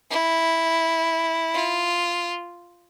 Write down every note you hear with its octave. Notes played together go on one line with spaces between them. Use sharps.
E4
F4